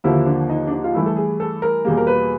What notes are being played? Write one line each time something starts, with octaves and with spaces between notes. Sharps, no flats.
D#2 D3 F3 A#3 E4
D4
D#4
D4
D#4
F4
G2 E3 A3 E4
A4
G#4
A4
A#4
E2 B2 G3 A#3
A#4
B4